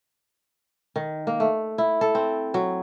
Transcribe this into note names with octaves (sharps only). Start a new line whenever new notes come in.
D#3
A#3
A3
E4
A4
C4
F#3